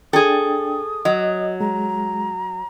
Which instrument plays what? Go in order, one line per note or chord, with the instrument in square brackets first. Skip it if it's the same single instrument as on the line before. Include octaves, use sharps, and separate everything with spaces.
[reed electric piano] D4 G5 [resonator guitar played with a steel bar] G#4 A4 [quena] D#6
[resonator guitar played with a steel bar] F#3 [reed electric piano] D#5
[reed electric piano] G#3 [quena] A#5